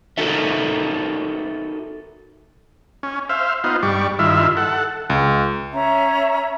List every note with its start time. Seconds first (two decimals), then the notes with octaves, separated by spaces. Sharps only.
0.18 D#4 F#4 A4 A#4 E5
3.03 C#4
3.29 C5 E5 F5
3.64 B3 D#4 F4 C5
3.83 G2 G3 D5 C#6
4.19 G2 D#3 E4 F4 E5
4.57 A4 F#5
5.10 C#2
5.73 C#4 E5 A#5